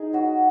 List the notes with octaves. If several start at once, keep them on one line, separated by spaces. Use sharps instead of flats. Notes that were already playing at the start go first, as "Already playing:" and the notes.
Already playing: D#4 G#4 D#5
F#3 F#4